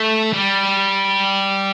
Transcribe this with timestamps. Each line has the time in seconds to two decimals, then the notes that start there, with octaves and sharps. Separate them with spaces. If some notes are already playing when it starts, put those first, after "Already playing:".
Already playing: A3
0.34 G3